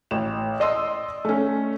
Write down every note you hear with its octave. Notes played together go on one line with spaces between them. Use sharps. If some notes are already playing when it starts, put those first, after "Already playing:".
A1 E7
D5 D#5 C6 E6
A3 C#4